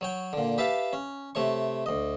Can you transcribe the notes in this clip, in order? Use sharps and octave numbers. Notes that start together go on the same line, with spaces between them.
F#3 C#5 G5
A#2 D3
G4 B4 E5 F5 A5
C#4
C3 A3 C#5 C#6
D2 D#5